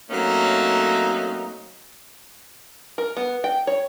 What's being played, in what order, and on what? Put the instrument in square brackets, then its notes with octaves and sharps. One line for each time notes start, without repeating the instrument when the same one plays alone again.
[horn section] F#3 A3 A#3 C4 C#4 D#4
[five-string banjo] A#4
B3
G5
C#5